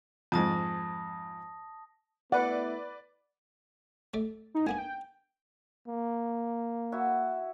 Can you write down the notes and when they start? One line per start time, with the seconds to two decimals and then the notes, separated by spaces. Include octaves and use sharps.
0.32 F2 G#2 A5 D#6 A#6
2.32 A3 B3 E4 B4 D5 F#5
4.14 A3 D5
4.54 D#4
4.67 A#3 B3 D4 G#5
4.78 G5
5.87 A#3
6.92 E4 F#4 E5